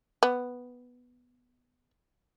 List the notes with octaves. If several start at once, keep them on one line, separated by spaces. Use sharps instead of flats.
B3